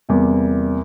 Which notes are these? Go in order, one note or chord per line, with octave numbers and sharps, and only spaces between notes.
E2 C3 G3 A#3